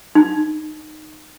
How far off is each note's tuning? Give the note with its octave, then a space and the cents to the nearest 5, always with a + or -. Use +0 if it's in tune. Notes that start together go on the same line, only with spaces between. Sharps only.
D#4 -15